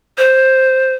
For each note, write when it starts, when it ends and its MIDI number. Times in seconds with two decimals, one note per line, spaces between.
0.18 0.94 72